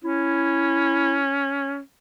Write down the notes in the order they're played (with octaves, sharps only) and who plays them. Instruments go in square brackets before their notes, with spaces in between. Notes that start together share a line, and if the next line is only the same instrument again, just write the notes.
[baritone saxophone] C#4 [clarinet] E4